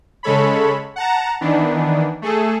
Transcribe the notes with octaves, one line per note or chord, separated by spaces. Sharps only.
C#3 G#3 A4 C#5 B5
F#5 A5 A#5
D#3 E3 B3 D4
A3 G#4 A4